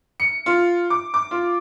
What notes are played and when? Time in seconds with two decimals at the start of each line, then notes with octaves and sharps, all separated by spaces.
0.20 C#7
0.46 F4
0.90 D6
1.14 D6
1.31 F4